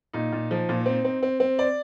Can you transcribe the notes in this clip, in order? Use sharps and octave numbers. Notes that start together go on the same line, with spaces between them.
A#2 D#4
A#2
F3
A#2
C4
C4
C4
C4
D5